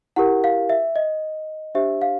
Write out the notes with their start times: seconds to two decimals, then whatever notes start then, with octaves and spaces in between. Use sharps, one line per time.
0.16 E4 G4 A#4 F#5
0.44 F5
0.69 E5
0.96 D#5
1.75 D4 G4 C5 E5
2.02 F5